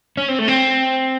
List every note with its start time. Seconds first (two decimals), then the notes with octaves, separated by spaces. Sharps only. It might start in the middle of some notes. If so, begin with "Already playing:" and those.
0.17 C#4
0.28 C4
0.39 A3
0.48 C4